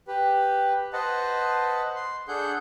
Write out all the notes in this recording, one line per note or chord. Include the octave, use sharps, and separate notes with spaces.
G4 B4
B4 C5 D#5 F#5 A5
C6
D4 G#4 A4 F#5 G6